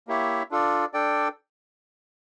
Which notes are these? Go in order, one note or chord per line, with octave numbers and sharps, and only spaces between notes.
A#3 E4 G4 C#5 E5
D4 F4 A4 D5
D4 A4 D5 G5